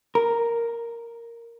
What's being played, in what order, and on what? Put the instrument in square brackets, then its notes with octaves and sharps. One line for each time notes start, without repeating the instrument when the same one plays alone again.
[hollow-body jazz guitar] A#4